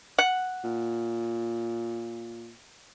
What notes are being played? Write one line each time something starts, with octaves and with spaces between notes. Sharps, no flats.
F#5
A#2